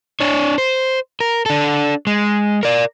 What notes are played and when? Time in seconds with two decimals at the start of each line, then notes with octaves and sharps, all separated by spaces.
0.20 D4 C#5
0.58 C5
1.20 A#4
1.46 D4 A4
2.07 G#3
2.63 A#4 D5